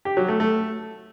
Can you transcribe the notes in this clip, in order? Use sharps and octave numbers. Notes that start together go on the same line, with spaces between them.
G4
F#3
A3
A3